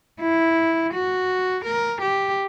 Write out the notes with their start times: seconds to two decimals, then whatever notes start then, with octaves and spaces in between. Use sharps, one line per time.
0.21 E4
0.93 F#4
1.65 A#4
2.01 G4